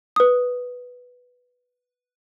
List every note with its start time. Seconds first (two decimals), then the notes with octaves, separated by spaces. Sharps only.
0.16 B4 D#6